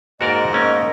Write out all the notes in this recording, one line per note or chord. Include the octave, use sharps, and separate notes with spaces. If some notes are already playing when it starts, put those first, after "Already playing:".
G#2 A#3 F#4 A#4 D5 D#5
A3 A#3 C#4 A#4 D#5